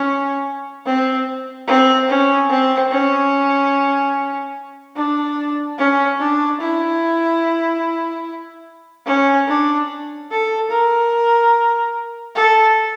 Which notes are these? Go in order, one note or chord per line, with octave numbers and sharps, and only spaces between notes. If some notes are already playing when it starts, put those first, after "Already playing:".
Already playing: C#4
C4
C4
C#4
C4
C#4
D4
C#4
D4
E4
C#4
D4
A4
A#4
A4